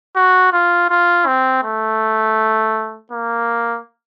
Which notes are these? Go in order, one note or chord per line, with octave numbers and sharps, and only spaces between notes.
F#4
F4
F4
C4
A3
A#3